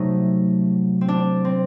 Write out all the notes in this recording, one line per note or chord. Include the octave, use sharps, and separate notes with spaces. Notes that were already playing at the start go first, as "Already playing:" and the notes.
Already playing: C3 F#3 A3 D#4
C4
D4
C4